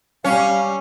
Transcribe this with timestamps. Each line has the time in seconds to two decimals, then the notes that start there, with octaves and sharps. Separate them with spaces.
0.24 G3 C#4 F5